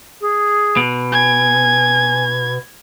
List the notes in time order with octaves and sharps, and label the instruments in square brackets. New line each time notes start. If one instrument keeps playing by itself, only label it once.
[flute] G#4
[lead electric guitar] B2
[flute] G#5 [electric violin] G#6